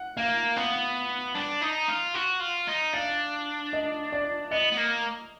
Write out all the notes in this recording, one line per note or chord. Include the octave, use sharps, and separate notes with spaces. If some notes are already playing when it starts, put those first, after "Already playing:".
Already playing: F#5
A#3 F5
B3 F5
D4
D#4
F4
F#4
F4
D#4
D4 F5
D#5
D5
B3 D#5
B3
A#3